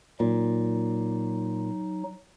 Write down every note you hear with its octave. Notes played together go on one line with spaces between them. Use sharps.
A#2 F#3 D#4